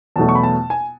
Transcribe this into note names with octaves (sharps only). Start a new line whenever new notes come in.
E2 B2 F#3 A3 A5
C#6
B5
A5
G#5